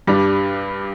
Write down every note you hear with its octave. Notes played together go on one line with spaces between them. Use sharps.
G2 G3 D4